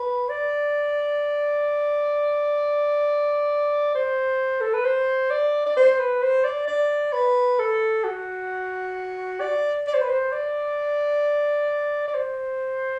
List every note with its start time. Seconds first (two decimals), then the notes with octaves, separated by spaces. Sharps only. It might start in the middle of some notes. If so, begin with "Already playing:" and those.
Already playing: B4
0.29 D5
3.95 C5
4.61 A4
4.74 B4
4.85 C5
5.30 D5
5.66 D5
5.76 C5
5.99 B4
6.22 C5
6.44 D5
6.67 D5
7.13 B4
7.59 A4
8.04 F#4
9.40 D5
9.87 D5
9.94 C5
10.01 B4
10.09 C5
10.32 D5
12.08 D5
12.14 C5